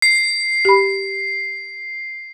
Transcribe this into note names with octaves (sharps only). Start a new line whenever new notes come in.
C7
G4 B5